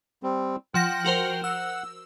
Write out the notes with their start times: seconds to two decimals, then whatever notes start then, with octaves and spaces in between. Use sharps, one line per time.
0.23 G3 C4
0.74 F3 F#5 G5 A#6
1.04 F#4 A#4 C5
1.44 F#5 E6